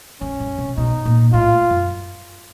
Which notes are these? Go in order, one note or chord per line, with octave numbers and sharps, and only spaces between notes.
F2 C#4
F#2
C3
B2 D#4
A#2
A2 F4
F#2